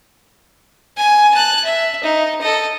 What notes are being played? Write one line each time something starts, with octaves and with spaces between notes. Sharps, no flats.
G#5
A5 F#6
E5
D#4
A4 D#5